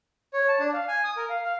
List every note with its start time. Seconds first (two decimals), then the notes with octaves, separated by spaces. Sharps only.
0.33 C#5
0.48 A5
0.60 D4
0.73 F5
0.88 G#5
1.04 D#6
1.17 A#4
1.30 F5
1.45 F5